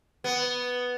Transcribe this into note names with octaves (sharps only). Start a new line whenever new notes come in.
B3